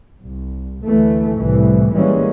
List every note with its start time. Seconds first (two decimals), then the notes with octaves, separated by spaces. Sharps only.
0.22 C2
0.84 D2 E3 A3
1.37 C2 A2 E3
1.95 E3 G3 G#3 A#3 C#4